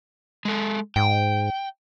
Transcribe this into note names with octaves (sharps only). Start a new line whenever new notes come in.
G#3 A4
G#2 G5